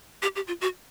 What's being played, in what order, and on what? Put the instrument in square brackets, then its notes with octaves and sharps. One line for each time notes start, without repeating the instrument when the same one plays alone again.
[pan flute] G4
G4
F4
F#4